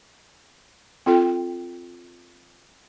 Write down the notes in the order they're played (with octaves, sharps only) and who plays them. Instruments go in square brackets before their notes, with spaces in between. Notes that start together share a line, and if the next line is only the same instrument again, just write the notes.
[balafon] C4 F4 A4 G5